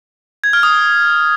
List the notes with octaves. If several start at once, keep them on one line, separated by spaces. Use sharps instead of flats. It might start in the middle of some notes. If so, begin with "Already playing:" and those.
G#6
F6
D#6